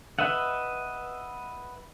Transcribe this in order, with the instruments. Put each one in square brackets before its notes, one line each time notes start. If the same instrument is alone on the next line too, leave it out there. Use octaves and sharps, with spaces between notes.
[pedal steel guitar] B4 D#5 E5 F#5